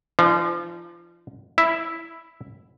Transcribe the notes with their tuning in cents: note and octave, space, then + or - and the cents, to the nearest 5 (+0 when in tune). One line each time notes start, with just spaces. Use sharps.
F3 -30 D4 +45
E4 +0 E5 +0